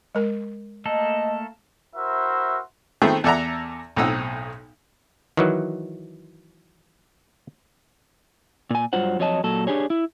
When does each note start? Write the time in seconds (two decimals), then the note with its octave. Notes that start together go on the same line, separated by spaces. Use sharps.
0.15 G#3 A#4
0.86 A3 A#3 A4 D#5
1.94 E4 F#4 A#4 C5 E5
3.02 D#3 A3 B3 C4 G#4 E5
3.24 E2 A4 D5 E5 F#5 A#5
3.96 B1 A2 C4 D#4 F#5 E6
5.37 D#3 E3 F#3
8.70 A#2 G#5
8.93 G2 F#3 F4 C5 F#5
9.19 F2 F#3 C#5 D#5 A5
9.44 A#2 F#3 A4
9.67 D4 G4 G#4 C#5
9.90 E4